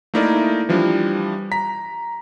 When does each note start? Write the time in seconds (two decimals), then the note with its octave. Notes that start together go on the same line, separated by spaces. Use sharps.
0.14 A3 A#3 D#4 E4 A#4 D5
0.69 E3 F3 G3 D4
1.52 A#5 B6